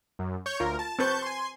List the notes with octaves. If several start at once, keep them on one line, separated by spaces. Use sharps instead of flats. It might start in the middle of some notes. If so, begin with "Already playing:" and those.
F#2
C#5 C#6 G6
D2 F4 A#4
A5
C4 B4 A5 C#6 G6
G#5 C6